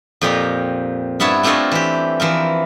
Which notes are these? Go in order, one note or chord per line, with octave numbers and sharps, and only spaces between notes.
F2 A#2 G4 A#5
G2 B3 E4 C#5 A5
A3 C4 D4 F4 C#5 D#5
E3 G4
E3 F3 A#4